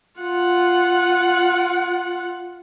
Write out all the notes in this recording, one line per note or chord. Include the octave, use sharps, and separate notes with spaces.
F4 F#5